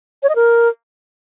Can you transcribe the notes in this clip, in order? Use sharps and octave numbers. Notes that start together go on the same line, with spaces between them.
C#5
D#5
A#4